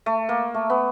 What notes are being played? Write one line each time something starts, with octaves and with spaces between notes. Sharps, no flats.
A3
A#3
A3
B3